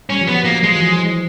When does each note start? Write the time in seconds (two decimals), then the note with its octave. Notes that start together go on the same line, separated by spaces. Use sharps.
0.09 G3 C#4
0.21 F3
0.27 F#3 B3
0.45 A#3
0.62 F#3 G#3
0.76 E3
0.80 F3
0.99 F#3